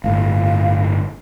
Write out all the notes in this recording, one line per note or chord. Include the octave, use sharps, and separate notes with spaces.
G1 A2 F5